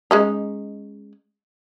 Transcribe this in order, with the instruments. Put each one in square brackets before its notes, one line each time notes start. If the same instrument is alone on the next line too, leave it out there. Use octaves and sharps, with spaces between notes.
[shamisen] G#3 C#4 D#4